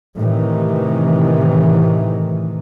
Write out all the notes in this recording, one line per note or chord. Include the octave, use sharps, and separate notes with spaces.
A2 C3 D#3 E3